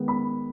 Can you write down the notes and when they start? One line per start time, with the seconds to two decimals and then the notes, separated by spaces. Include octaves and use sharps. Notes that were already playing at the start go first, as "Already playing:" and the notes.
Already playing: D#3 G#3 B3
0.08 B5